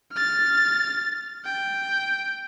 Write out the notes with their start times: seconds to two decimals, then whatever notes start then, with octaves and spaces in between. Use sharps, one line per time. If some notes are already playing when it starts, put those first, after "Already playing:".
0.12 F6 A6
1.45 G5